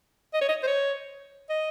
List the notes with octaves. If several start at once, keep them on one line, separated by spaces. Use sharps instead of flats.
D#5
C#5
D#5
C5
C#5
D#5